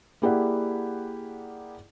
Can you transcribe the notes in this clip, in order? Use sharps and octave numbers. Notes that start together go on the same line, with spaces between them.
A#3 E4 G4 G#4 D5 F#5